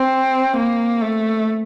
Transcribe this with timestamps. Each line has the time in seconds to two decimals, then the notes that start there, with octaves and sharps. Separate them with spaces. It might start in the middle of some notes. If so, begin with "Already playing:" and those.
Already playing: C4
0.57 A#3
1.02 A3